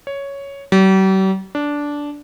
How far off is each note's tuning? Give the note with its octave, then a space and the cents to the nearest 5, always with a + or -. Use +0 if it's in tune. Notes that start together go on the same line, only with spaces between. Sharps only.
C#5 +5
G3 -45
D4 -10